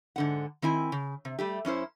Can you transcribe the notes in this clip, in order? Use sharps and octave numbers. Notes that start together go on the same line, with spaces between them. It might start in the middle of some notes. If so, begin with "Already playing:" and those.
G#2 D3 F#5
D#3 C4 E4 G#5
C#3
C3
G3 A3 G4
F#2 C#4 E4 C5